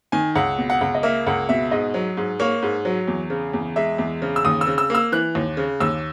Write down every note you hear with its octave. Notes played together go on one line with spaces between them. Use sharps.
D#3 G#5
C#2 F#5
B2
F#5
C#2
D#5
A#3 E5
C#2 F#5
B2 E5
G#2 D#5
F#3
G#2
A#3 C#5
G#2
F#3
E2
C#3
E2
G#3 E5
E2
C#3
E6
D#2 D#6
E6
C#3
E6
A#3 E6
E3 F#6
D#2
C#3
D#2 E6